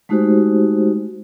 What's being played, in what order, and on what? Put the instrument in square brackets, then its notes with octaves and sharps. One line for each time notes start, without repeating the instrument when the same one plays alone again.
[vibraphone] G#3 A3 D#4 F#4 G4 C5